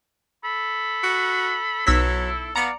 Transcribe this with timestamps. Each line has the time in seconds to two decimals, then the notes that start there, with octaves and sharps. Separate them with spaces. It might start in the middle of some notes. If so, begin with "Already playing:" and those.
0.44 A4 B5
1.03 F#4
1.87 B1 F#3 E4 E6 B6
2.56 B3 D5 F5 A#5 C#7